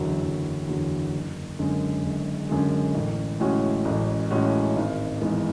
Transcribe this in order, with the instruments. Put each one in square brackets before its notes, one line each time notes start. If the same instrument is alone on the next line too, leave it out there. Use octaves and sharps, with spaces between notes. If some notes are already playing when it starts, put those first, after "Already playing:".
Already playing: [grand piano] F#1 E2 D3 F#3
F#1
E2 D3 F#3
F#1
F#2 D3 G#3
F#1
F#2 D3 G#3
A1
A2 G#3 C#4 F#4
A1
A2 G#3 C#4 F#4
G#1
G#2 E3 G#3 B3